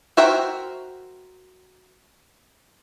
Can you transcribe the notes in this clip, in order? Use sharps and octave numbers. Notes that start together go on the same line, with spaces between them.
F#4 A#4 C5 E5 G5